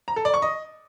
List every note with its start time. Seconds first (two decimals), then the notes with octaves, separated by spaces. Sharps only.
0.08 A#5
0.16 A4
0.25 D5
0.34 C#6
0.42 D#5